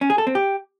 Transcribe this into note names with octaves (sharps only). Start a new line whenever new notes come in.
C#4
G#4
A4
C4
G4